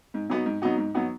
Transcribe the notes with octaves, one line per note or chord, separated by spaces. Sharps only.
G#2
F#3 B3 D#4 F#4
G#2
F#3 B3 D#4 F#4
G#2
F#3 B3 D#4 F#4